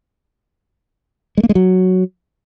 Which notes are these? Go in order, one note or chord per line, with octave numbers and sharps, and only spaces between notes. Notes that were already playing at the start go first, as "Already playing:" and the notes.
G#3
A#3
G#3
F#3